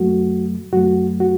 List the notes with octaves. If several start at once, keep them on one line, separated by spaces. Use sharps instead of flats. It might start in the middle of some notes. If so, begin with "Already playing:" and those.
Already playing: F#2 F#3 A3 F#4
F#2 F#3 A3 F#4
F#4